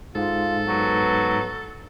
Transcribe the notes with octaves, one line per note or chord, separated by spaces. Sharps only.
G#2 F4 A4
F#3 B3